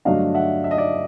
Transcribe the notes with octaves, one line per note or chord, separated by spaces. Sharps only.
G2 D3 F#3 A3 D4 D#5 F5
E5 F#5
E5
D#5
D5 E5